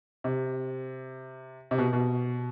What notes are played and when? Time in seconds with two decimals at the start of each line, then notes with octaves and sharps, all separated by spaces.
0.24 C3
1.71 C3
1.78 B2
1.93 B2